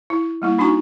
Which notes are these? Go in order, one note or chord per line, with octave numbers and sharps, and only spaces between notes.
E4
G3 A#3 E4
D4 D#4 F#4 G#5 A#5 C#6